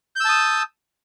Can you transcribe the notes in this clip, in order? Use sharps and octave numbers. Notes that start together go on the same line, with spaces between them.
A5 D#6 E6 G6